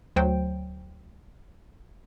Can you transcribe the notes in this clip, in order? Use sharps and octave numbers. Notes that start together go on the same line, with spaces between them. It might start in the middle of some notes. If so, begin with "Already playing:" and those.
D2 F#3 C5 G5